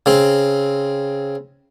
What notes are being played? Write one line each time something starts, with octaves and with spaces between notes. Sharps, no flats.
C#3 C4